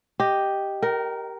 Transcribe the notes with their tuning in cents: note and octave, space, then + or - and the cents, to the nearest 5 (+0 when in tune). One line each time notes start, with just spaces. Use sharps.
G4 +0 D#5 +0
A#4 +0 G5 -35